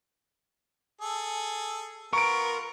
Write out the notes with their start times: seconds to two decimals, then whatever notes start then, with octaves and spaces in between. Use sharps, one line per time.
1.01 G#4 A4
2.13 B3 F4 A#4 C#6 D7